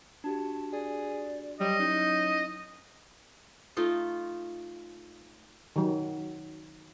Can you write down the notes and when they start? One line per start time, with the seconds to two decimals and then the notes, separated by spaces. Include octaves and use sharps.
0.24 D4 F#4 G4 A5
0.73 G#4 D5
1.60 F#3 G3 D#5
1.79 C#4 D#4 E4
3.77 A3 D#4 F4
5.76 D#3 F#3